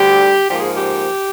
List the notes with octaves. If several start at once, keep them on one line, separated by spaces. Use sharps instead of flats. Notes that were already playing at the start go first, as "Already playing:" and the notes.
Already playing: D2 D3 G3 G4
G#2 F3 A#3 G4
G#4
G4